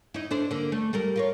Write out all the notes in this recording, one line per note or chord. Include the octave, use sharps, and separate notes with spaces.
D#4 E4
D4 A4 C5
D3 A#3
A3
G3 A4 A#4
F4 A#4 C#5